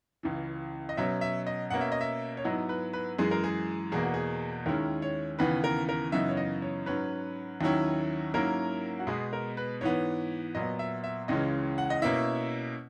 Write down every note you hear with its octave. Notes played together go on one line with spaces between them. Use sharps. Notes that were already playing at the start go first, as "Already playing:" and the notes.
C#2 C#3 E3
D#5
B2 F#3 C#4 E5
E5
D#5
B2 A#3 C#4 F#5
E5
D#5
E5
C#5
G#2 F#3 B3 E4 D#5
B4
B4
F#2 E3 G#3 G#4
A#4
G#4
E2 B2 A#3 G#4
F#4
G#4
D#2 D#3 G#3 C#4 E4 A#4
C#5
D#2 C#3 E3 B3 B4
A#4
A#4
F#2 C#3 E3 B3 D#4 E5
C#5
D#5
C#5
G#2 F#3 C#4 B4
D#2 D#3 F#3 C#4 E4
G#2 F#3 A#3 C#4 E4 A#4
F#4
B2 G#3 B3 G#4
A#4
B4
G#2 E3 B3 C#5
A#2 F#3 B3 D#5
E5
E5
C#2 C#3 E3 G#3 C#4 D#5
F#5
D#5
B2 A#3 C#4 E4 E5